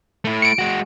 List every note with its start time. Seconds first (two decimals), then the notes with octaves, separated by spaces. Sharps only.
0.25 A3 E4
0.42 C#7 D7
0.59 G#3 F#4